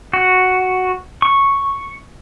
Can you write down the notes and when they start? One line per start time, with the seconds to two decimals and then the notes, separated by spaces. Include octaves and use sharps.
0.13 F#4
1.22 C#6